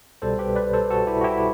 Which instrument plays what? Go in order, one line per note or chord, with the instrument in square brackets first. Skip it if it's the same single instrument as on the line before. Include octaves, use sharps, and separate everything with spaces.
[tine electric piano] C2 B2 G3 A4 C5
G4 B4
B4 D5
A4 C5
F#4 A4
E4 G4
F#4
E4 G4